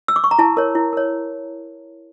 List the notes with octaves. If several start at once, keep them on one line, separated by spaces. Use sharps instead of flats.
E6
D6
C#6
A#5
E4 A5
A#4 C#5
E4
A#4 C#5